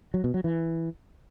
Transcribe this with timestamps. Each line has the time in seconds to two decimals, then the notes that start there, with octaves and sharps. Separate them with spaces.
0.14 F#3
0.24 B2
0.34 F#3
0.44 E3